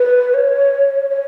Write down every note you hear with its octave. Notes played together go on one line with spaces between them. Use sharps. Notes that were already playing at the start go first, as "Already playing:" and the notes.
Already playing: B4
C#5
C#5